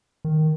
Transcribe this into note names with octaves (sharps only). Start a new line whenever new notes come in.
D#3